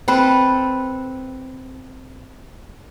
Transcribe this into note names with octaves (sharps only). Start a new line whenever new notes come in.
C4 A4 B4